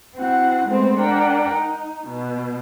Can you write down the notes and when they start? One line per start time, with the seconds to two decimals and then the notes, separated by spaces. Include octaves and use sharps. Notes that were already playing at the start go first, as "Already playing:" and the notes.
0.15 C4 E4 F#4 F#5
0.66 G#3 A3 B3 C4 C5
0.98 D4 A#4 F#5 G5
1.52 D#4
2.08 B2